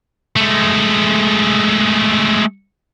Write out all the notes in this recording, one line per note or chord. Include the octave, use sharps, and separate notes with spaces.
G#3 A3